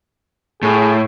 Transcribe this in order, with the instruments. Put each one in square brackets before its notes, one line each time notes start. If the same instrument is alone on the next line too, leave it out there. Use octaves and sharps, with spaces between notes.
[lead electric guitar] A2 [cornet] G#4